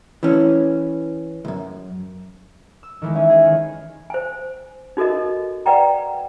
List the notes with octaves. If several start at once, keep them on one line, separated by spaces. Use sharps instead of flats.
E3 C#4
C2 F#2
E6
D#3 E3 G#3
C#4 E5
G#4
D#3
C5 G#5
D#4 F#4 A4 A#4 D#5
B4 D5 F#5 G5 A#5